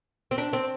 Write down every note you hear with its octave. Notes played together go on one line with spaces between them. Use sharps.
C4
D4
C4